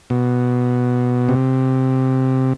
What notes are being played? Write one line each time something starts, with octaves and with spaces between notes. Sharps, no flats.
B2
C3